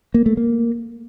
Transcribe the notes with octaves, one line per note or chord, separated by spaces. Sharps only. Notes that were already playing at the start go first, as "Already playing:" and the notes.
A#3
A3
A#3